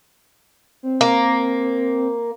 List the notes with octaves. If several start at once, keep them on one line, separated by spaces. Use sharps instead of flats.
C4
A#3